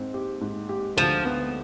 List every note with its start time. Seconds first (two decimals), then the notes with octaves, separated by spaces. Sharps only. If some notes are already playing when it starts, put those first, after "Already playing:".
Already playing: G#2 C4
0.14 G4
0.41 G#2
0.69 G4
0.97 D2 F3
1.25 B3